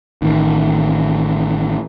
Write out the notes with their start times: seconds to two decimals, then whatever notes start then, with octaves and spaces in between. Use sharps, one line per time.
0.22 A1 D#3